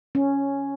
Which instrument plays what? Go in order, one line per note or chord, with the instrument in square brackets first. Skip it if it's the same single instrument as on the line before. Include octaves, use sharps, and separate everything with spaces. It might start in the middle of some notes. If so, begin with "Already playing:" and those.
[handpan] C#4